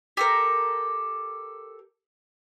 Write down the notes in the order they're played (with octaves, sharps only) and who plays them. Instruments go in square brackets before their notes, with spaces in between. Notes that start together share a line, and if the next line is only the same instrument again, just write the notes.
[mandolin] G4 A4 A#4